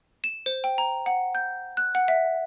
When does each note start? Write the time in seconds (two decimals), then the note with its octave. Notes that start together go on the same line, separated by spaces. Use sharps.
0.24 E7
0.46 C5
0.64 G5
0.78 A#5
1.06 F#5
1.35 G6
1.77 F#6
1.95 F#5
2.08 E5